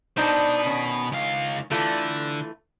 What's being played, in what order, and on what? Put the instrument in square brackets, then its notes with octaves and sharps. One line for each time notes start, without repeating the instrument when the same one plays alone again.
[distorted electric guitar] B2 B3 [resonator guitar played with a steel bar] D4 D#4 C5
[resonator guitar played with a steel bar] D#3 C#4
[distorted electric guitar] C#2 F5
[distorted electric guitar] D3 [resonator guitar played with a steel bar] E3 A3 F4